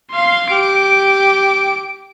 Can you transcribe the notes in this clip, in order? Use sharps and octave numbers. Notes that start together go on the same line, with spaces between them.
F5 C6
G4 D7